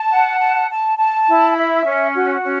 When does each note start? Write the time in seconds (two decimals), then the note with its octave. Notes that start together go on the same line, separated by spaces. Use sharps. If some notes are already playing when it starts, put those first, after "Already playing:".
Already playing: A5
0.10 F#5
0.40 A5
0.69 A5
0.97 A5
1.28 E4
1.56 E5
1.85 C#4
2.15 F#4
2.44 C#4